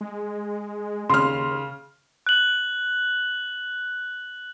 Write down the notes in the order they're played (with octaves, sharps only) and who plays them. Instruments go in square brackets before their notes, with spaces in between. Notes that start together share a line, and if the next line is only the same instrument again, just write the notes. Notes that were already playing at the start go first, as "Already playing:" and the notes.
[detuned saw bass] G#3
[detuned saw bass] D#2 [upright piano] C#3 [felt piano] C6 F6
[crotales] F#6 F#7